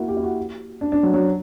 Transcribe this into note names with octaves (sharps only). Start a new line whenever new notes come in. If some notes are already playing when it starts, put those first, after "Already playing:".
Already playing: A#3 E4 F#4
G4
E4
F#4
D4
D4
F#3
F#3